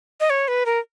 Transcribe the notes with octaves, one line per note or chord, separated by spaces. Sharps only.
D#5
C#5
B4
A#4